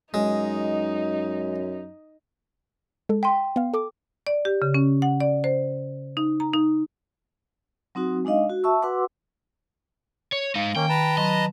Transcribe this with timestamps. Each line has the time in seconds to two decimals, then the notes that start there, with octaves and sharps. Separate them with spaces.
0.14 F#2 G#3 D#4
3.09 G#3 A4
3.23 G5 C6 B6 D#7
3.56 B3 F5
3.73 A4 D6
4.27 D5
4.45 G4
4.62 C#3
4.74 C#4
5.02 F#5
5.20 D5
5.44 C5
6.17 D#4
6.40 A#5
6.54 D#4
7.95 F#3 C4 D#4 F#4
8.25 G#3 D4 D#4 D#5 F5
8.50 F#4
8.64 E5 A5 C#6 E6
8.82 F#4 B4 F#5 C6 D6 E6
10.32 C#5
10.55 G#3 D#4 F5
10.76 D#3 A#3 C#4 G5
10.89 B4 A5 A#5
11.18 F#3 D#5 C6